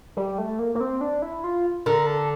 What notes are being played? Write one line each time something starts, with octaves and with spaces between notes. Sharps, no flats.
G3
A3
A#3
A#3
C4
D4
E4
F4
D3 A#4
A4